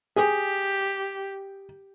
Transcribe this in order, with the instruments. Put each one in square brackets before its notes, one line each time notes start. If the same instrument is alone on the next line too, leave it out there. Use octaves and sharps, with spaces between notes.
[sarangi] G4 [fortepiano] G#4